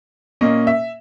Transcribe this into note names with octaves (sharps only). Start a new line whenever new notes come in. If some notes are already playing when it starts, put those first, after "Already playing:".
A#2 A#3 C#4 D#5
E5